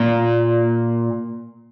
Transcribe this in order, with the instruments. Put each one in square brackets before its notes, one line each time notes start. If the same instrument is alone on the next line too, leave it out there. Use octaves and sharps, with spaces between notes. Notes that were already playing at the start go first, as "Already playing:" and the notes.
Already playing: [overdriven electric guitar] A#2